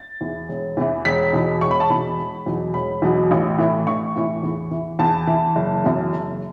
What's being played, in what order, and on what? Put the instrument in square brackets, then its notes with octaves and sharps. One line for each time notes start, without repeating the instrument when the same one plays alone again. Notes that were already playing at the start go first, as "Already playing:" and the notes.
Already playing: [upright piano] A6
E2 E3
E1
E2 E3
E1 B6
E2 B2
E1 C#6
B5
A5
E2 B2 B5
E1
E2 B2 F#3
E1 B5
E2 B2 F#3
A1
A2 E3
A1 C#6
A2 E3
E2
E3
E2 A5
E3
F#1
F#2 E3
F#1